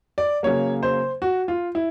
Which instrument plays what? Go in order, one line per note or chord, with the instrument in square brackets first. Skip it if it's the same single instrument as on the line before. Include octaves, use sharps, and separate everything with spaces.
[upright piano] D5
C#3 F#3 A#3 C#5
C5
F#4
F4
E4